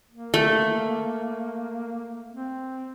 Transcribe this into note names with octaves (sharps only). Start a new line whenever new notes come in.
A#3
A3
C4